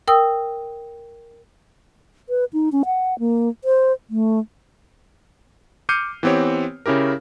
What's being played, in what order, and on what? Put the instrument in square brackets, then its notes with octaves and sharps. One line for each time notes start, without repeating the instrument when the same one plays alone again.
[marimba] A#4 G5 D#6 E6
[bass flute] B4
D#4
C#4
F#5
A#3
C5
A3
[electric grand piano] D6 F6 G6 C7 C#7 D#7
E3 B3 C4 G4 C#5
C#3 C#4 E4 G4 A#4